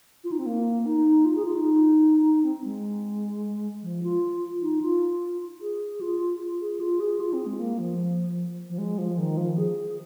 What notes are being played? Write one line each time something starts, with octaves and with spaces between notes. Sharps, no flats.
F4
D#4
C4
A#3
D#4
F4
G#4
F4
D#4
C4
G#3
F3
F4
D#4
F4
G#4
F4
G#4
F4
G#4
F4
C4
G#3
A#3
F3
F3
G#3
F3
D#3
F3
G#4